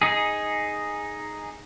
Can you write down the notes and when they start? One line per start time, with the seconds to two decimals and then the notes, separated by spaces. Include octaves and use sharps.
0.02 D#4 G#4